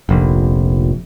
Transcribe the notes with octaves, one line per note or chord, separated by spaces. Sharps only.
F1 A#1